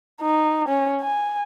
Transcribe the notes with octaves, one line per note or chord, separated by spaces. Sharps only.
D#4
C#4
G#5